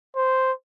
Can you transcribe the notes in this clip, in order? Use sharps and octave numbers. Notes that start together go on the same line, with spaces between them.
C5